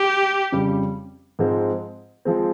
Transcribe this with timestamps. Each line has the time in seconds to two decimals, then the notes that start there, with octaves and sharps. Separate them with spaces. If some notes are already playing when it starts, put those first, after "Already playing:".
Already playing: G4
0.52 F2 C#3 G3
1.39 G#2 F3 G#3 C4
2.25 F3 G#3 C4